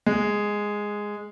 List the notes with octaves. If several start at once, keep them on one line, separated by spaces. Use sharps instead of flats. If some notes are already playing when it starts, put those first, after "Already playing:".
G#3